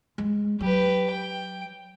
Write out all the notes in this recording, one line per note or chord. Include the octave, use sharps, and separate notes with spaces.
G#3
F#3 G4 B4
G5